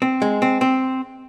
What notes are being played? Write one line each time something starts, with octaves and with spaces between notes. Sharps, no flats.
C4
G#3
C4
C4